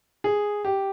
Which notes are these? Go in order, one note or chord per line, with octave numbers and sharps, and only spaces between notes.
G#4
G4